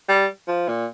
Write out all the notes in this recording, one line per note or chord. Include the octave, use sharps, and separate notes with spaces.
G3
F3
A#2